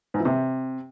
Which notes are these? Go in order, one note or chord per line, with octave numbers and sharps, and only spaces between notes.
G#2
E3
C3